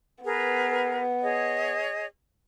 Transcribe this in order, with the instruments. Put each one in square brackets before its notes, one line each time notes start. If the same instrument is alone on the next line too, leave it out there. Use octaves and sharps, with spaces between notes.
[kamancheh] B3 [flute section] G#4 A#4 B4
[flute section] G#4 C#5 D#5